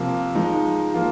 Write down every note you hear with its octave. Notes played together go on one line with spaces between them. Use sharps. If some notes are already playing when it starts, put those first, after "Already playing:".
Already playing: C3 F3 A#3
F3 G#3 D#4
F3 A#3 F4